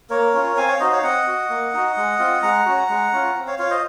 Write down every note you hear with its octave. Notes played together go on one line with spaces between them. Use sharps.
A#3 A#4 C#5
C#4 F4
C4 F5 G#5
C#5 F5
D#4 F#4 C5 D#5
C#5 F5
C4 D#5 F#5
F#4
A#3
D#4 F#4
G#3
C4 F4
G#3 F#5 A#5
C#4 F#4
G#3
C#4 F4
C4
C#5 F5
F4 C#5 F5
C5 D#5